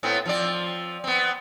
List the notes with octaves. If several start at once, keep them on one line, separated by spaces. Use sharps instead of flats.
A2 B3 C4
F3 C4 D5
B3 C4